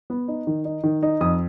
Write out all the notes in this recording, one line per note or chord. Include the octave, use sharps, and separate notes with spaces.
B3
D#4
D#3
D#4
D#3
D#4
F2 D#6